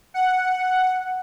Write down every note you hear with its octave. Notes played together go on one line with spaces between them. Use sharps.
F#5